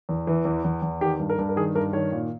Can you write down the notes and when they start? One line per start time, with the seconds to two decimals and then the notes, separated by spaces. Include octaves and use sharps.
0.09 E2
0.27 E3
0.45 E2
0.65 E2
0.82 E2
1.01 D#3 G4
1.19 G2
1.30 A#4
1.38 G2
1.49 A#4
1.56 D#3 G#4
1.75 G2 A#4
1.93 D#3 C#5
2.12 A#2